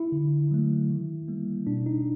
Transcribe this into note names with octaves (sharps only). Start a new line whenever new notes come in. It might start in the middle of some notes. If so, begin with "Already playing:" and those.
Already playing: E4
D3
F#3 A3
D#3
G3 A#3
B2 D4
D#4